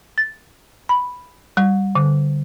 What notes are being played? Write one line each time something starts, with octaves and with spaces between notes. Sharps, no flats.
A6
B5
G3
D3